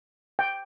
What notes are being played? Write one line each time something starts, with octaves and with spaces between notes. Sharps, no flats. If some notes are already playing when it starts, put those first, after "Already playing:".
G5